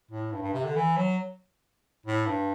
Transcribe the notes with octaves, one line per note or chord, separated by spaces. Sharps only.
A2
G2
G2
C3
D3
E3
F#3
A2
G2